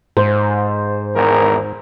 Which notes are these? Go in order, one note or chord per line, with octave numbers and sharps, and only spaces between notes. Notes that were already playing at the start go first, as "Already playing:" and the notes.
G#2 C5
G#1 E2 A#4